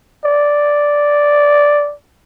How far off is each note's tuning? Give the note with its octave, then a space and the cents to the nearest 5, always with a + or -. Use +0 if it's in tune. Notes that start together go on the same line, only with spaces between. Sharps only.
D5 -5